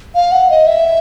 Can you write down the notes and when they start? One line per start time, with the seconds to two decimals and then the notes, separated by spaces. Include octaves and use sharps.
0.15 F5
0.32 F#5
0.50 D#5
0.67 E5